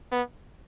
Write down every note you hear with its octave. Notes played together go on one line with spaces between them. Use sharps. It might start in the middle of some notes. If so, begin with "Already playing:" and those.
B3